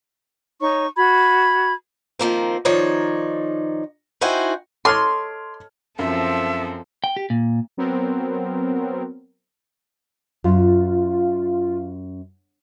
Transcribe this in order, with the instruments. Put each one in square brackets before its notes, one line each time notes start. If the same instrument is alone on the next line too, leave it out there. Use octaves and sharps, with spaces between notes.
[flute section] D#4 C#5 C#6
F#4 B5 G#6
[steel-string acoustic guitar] D#3 F3 A#3 C4
D#3 F3 D#4 C#5 D5
D#4 E4 F#4 C5 G5 G#5
[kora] A4 C#5 D#5 [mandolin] C6 [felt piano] D6 F6 G#6
[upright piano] F#2 [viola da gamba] F3 C4 A4 [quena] E5
[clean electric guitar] G5
G4
A#2
[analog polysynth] F#3 B3 C4 A#4
[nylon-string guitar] F#2 [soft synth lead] F4